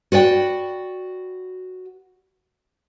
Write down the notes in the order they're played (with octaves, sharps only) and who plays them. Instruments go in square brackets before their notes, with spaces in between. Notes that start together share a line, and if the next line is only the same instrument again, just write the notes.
[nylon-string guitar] F#4 B4 D5 G5